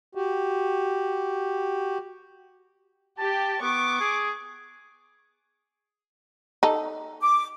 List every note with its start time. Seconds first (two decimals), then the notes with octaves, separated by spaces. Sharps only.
0.15 F#4 G4
3.18 G4 A5
3.62 B3 C#6 D6
4.00 G#4
6.63 D#4 A4
7.22 D6